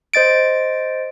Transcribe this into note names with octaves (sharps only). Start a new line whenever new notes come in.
C5 D#5 A6 D7